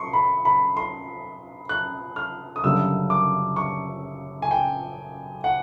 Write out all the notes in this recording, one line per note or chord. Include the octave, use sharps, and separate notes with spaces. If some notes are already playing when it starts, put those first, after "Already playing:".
Already playing: C6 C#6
B5
B5
C6
F#6
F6
D#6
F#1 F#2 D3 G3 A#3 E6
D6
C#6
G#5
G5
F#5